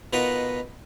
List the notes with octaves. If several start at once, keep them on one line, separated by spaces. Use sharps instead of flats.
B2 D#4 F4 A#4 B4 F#5